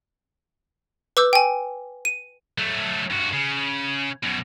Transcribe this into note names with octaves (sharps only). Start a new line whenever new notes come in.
B4 D6 E6 G6
G5 G#5
D#7
F#3 A3
G2 F#4
C#3
F#2 B2